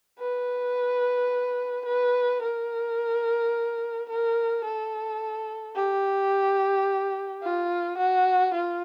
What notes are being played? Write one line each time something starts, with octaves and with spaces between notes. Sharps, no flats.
B4
B4
A#4
A#4
A4
G4
F4
F#4
F4